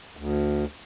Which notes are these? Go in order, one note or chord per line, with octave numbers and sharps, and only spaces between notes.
D2